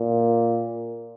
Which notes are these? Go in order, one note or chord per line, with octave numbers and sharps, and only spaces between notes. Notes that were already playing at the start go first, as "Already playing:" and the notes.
Already playing: A#2